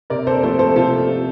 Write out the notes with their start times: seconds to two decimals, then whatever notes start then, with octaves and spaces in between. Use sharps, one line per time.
0.10 C3 A#4 D5
0.27 A4 C5
0.43 F3 A3 A4 C5
0.59 A4 C5
0.76 C3 F4 A4